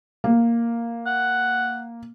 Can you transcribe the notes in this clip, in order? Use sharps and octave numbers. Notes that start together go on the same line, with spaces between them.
A#3
F#5